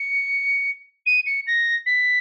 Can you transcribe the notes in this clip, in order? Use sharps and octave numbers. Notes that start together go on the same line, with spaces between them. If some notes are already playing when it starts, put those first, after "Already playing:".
Already playing: C#7
D#7
C#7
A#6
B6